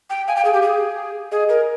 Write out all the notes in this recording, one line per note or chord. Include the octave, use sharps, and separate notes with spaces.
G5
F5 G#5
G5
G#4
G4
G#4
G#4 D#5
A#4